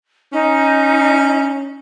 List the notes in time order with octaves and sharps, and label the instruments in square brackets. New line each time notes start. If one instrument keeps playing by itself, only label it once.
[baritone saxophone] C#4 [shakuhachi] D#4